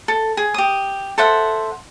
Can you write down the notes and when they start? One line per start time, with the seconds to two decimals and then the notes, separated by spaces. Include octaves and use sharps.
0.08 A4
0.37 G#4
0.54 G4 D#6
1.18 A4 C5 E5 F#5